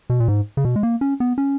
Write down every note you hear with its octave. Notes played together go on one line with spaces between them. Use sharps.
B2
A#2
G#2
C#3
B2
G#3
A#3
C#4
B3
C#4